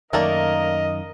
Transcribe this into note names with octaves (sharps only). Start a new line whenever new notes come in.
F#2 D#3 A3 A#3 A#4 D5 D#5